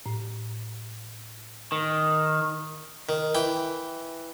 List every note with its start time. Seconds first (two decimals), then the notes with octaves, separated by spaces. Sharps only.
0.06 A2
1.72 D#3
3.09 D#3
3.35 E3 G5